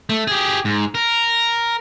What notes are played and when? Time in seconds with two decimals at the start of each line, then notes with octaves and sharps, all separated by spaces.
0.10 A3
0.27 G4 G#4
0.65 G#2
0.95 A#4